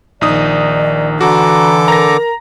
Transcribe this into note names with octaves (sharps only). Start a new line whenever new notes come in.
A#1 D#3 D#4 D5 D#6
D3 E3 F#4 A4 A#5 D6
A#4 A#5 A#6